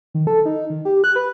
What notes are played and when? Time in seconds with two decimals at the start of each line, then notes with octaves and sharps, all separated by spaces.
0.15 D#3
0.27 A4
0.45 D#4
0.70 D#3
0.85 G4
1.04 F#6
1.16 B4